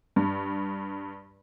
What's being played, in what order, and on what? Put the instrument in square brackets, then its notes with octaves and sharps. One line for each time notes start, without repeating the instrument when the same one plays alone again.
[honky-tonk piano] G2